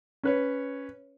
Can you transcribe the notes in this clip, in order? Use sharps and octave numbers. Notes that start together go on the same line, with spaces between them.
C#4 B4 C#5